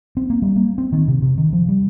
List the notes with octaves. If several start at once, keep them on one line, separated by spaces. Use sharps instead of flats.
C4
A#3
G3
A#3
C4
D#3
C3
C3
D#3
F3
G3